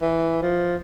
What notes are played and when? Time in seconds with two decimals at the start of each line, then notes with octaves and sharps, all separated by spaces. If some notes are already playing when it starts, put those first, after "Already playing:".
0.02 E3
0.42 F3